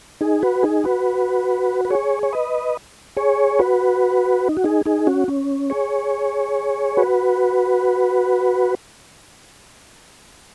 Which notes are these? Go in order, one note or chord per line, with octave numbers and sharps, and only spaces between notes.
D#4 G#4
F#4 B4
D#4 G#4
F#4 B4
B4
G#4 C#5
C#5
B4 D#5
G#4 C#5
F#4 B4
D#4
F#4
D#4 G#4
D#4 G#4
C#4 F#4
C#4
G#4 C#5
F#4 B4